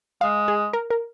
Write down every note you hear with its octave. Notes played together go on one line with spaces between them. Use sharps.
G#3 F5
G#4
A#4
A#4